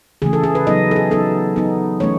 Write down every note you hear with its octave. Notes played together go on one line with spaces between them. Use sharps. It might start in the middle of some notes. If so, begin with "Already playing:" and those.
C#3 E3 A3 G#4
A4
G#4
B4
F#3 B3 D#4 D#5
A4
G#4
F#3 B3 D#4 A4
F#3 B3 D#4
E3 A3 C#4 C#5